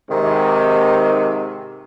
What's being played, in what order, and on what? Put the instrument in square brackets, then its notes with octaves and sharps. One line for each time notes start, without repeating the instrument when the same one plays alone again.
[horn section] G#2 C3 [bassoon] D#3